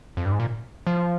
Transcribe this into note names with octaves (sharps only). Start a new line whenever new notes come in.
F2
G2
G#2
A#2
F3